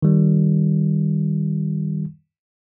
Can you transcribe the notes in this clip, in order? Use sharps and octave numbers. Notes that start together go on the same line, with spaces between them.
D#3 G3